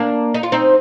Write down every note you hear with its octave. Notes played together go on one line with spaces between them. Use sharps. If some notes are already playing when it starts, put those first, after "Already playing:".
Already playing: A#3 D4
D#4
F4
C4 D#4